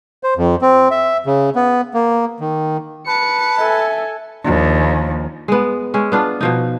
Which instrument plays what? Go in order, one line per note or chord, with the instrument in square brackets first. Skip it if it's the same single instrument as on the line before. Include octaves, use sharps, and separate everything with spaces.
[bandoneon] C5
F2
C4
E5
C#3
B3
A#3
D#3
[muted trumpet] B4 [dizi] A5 [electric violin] C#7
[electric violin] A4 G#5 [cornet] E5
[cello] D#2 [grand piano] F3 A#3 D4
[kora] G#3 B3
G#3 C#4
B3 D4 F4
B2 F3 D#4